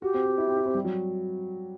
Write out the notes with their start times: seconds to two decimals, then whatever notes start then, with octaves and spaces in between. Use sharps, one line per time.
0.02 F#4 G4
0.14 C4
0.26 F#4
0.38 E4
0.48 C4
0.57 E4
0.66 C4
0.75 G3
0.85 F#3